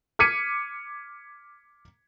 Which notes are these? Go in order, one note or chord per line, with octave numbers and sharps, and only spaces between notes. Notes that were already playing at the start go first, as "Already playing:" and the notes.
D6 F6 G#6 B6 C#7 D#7